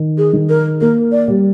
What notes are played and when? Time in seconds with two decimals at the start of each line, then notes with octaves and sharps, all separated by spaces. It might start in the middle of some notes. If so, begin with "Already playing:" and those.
Already playing: D#3
0.18 G#4
0.33 D#3
0.49 A#4
0.81 A#3 A#4
1.12 D5
1.28 G3